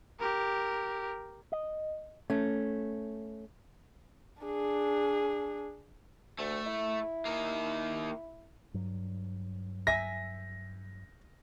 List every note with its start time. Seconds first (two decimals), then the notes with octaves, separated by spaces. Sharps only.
0.20 G4 A#4
1.52 D#5
2.30 A3 C#4
4.43 D4 G#4
6.39 D2 A3
6.66 E4
7.25 D#3 A#3
8.74 G2 F#3
9.87 E5 G#5 A#6